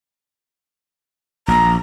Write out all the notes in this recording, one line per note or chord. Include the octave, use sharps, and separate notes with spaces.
A#1 A#5